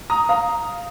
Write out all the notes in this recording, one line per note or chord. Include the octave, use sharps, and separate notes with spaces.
A#5 D#6
F5 A#5